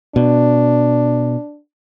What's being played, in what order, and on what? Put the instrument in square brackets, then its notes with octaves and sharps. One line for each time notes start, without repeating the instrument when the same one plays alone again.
[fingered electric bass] B2 [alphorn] D4